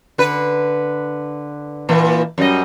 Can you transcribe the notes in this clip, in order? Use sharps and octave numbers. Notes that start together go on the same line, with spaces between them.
D3 B4
A#2 E3 A#3
F#2 G3 D#5